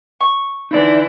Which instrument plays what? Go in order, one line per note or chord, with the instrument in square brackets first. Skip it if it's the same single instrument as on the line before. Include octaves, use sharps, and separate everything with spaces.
[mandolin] C#6
[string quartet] D3 E3 E4 [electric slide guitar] D#4 D5